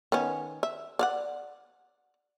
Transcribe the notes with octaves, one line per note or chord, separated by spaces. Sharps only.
D#3 B3 C#4
E5
D5 F5 F#5